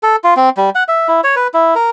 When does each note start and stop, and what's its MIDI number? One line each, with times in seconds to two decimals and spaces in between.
0.03 0.16 69
0.24 0.34 65
0.36 0.49 60
0.57 0.70 55
0.75 0.83 78
0.88 1.08 76
1.08 1.21 64
1.24 1.35 73
1.36 1.47 71
1.54 1.74 64
1.75 1.90 70